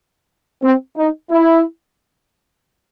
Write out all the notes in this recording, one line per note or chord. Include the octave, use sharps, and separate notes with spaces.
C4
D#4
E4